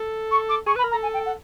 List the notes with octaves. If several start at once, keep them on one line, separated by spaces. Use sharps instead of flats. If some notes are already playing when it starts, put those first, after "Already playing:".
Already playing: A4
C#6
D6
G#4 C#6
B4 B5
A#4
A#5
A4
G#5
G5
F#5